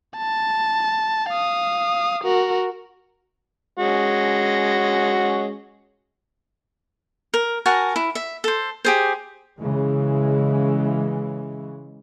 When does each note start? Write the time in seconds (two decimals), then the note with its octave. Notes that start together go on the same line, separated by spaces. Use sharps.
0.18 A5
1.29 F5 D#6
2.23 F#4 A#4
3.78 G#3 C#4 F#4
7.34 A#4
7.66 F#4 A#4 G#5 A5
7.96 E4
8.15 E5
8.44 A4 C5
8.85 G4 G#4 C5
9.59 C#3 E3 G#3